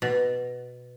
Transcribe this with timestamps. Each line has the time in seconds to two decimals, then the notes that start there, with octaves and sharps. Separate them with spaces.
0.02 B2